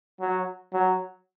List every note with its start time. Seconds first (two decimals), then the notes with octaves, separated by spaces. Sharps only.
0.21 F#3
0.74 F#3